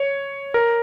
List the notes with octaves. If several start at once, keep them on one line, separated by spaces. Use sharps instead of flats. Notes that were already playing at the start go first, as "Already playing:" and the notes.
Already playing: C#5
A#4